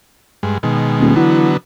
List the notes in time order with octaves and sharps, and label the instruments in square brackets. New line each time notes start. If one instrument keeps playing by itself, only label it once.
[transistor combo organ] G2 G#3
B2 D#3 G#3
[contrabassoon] D#1
[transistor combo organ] D3 F#3 B3 [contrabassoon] E3